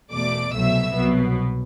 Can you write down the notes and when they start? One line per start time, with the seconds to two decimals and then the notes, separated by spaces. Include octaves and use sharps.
0.12 E2 B2 A3 D5 D6
0.53 C2 B2 F#3 A3 E5 E6
0.95 C2 B2 F#3 B3